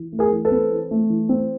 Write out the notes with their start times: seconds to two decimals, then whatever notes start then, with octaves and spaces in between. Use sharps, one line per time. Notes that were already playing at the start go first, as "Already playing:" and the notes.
Already playing: E3
0.12 A3
0.19 G#4 A#4
0.32 E3
0.45 A4 B4
0.52 C4
0.72 E3
0.91 A3
1.10 E3
1.29 C4